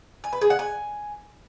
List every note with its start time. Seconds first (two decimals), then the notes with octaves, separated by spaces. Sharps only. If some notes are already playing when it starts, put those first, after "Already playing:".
0.24 G#5
0.33 B4
0.41 G#4
0.50 F#5
0.59 G#5